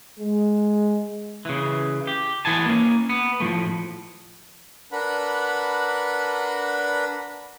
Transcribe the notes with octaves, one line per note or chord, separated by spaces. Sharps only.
G#3
C#3 E3
G4
A2 E3 B3 G#5 A5
A#3 C#4
B3
A2 F3 A3
D4 A#4 B4 F#5 B5